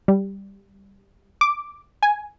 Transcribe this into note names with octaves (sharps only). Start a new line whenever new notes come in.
G3
D6
G#5